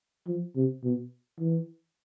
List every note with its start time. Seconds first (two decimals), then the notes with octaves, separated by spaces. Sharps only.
0.27 F3
0.56 C3
0.84 B2
1.40 E3